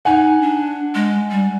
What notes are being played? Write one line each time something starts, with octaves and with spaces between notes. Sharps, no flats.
D#4 F#5 G#5
D4
G#3
G3